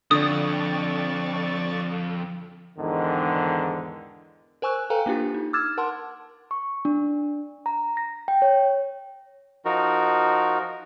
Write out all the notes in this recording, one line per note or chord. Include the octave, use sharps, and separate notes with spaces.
F2 D3 D5 C#6 D#6 A6
E2 G#2 D3 D#3
A#4 C5 G#5 C#6 E6 F#6
A4 B4 F5 G5 G#5 A#5
A#3 D4 E4 F4 G4
D#4
D6 E6 F6 G#6 A6 E7
A#4 F#5 A5 C6
C#6
D4
A#5
A#6
G5
C#5
F3 D#4 F#4 A#4